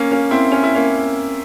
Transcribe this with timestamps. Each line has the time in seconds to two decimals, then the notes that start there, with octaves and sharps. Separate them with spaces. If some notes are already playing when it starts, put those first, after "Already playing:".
Already playing: A#3 C#4
0.11 A#3 C#4
0.31 C4 E4
0.52 C#4
0.63 E4
0.75 A#3 C#4